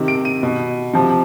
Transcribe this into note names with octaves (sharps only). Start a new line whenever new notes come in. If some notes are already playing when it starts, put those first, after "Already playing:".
Already playing: C3 D#3
D7
D#7
B2
C3 F3